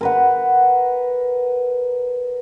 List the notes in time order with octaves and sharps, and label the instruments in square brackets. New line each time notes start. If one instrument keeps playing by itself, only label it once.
[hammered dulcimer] A#4 B4 F#5